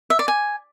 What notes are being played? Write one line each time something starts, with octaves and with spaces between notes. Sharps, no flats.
E5
D5
G#5